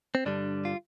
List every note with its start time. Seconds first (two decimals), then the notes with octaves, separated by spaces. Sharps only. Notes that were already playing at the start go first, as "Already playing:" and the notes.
0.15 C4
0.26 G2 D3 G3 D4
0.65 F4